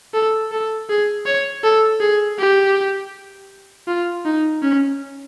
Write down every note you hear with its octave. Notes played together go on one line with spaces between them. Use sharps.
A4
A4
G#4
C#5
A4
G#4
G4
F4
D#4
C#4